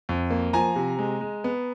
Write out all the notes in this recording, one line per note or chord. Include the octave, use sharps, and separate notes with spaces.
F2
A#3
F3 G#5 A#5
C3
G#3
G#3
B3